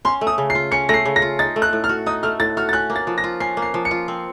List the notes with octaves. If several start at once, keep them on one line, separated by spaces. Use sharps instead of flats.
C#4 C6
A3
D#6
C#3
C7
F4
C#4 C#7
A3 A#6
C7
C#3
A#6
F4
D#4 A6
A3
F#6
A2
F6
F#4
D#4 D#6
A3 F6
A2 A6
F#4 F6
A6
C#4 F#6
A#3
A6
F3
A#6
F4
C#4 C7
A#3
C7
F3
C#7
F4
C4